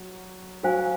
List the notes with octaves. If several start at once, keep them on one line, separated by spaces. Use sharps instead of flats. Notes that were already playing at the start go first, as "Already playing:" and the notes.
Already playing: F#3
F#3 F#4 C5 F5 G#5